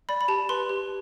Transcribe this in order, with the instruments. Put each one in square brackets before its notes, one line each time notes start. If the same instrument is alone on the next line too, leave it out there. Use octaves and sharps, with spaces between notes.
[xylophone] D5 B5
B5
G4 A5
B4 C6
G4